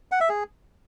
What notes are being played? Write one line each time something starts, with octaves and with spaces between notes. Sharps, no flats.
F#5
E5
G#4